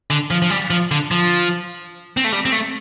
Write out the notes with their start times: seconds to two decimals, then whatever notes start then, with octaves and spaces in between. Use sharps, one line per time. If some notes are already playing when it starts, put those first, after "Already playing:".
0.10 D3
0.31 F3
0.42 F3
0.50 G3
0.70 F3
0.91 D3
1.11 F3
2.17 C4
2.24 A3
2.32 G3
2.45 C4
2.52 A3